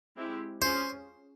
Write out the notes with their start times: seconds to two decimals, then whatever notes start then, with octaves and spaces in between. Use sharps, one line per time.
0.16 G#3 C4 E4 G4
0.62 C#4 F4 G#4 C5